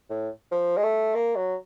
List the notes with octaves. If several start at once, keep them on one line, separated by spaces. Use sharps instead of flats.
A2
F3
G#3
A3
A#3
F#3